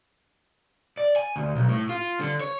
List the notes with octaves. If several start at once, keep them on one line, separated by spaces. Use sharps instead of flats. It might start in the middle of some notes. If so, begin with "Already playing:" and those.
D5
G#5
D2
B1
A2
F4
D3
C#5